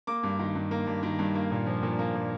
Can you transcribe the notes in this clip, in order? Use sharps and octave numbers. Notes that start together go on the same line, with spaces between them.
A#3 D6
G2
D#3
G2
A#3
G2
D#3
G2
A#3
A#2
F3
A#2
A#3
A#2